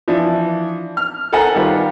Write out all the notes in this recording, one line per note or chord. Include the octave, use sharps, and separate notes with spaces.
E3 F3 D4
F6
A4 A#4 C5 F#5 G#5 A#5
D#3 G3 F4 B4